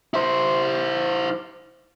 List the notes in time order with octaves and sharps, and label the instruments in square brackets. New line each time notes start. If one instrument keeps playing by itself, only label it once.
[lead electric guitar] E4 C5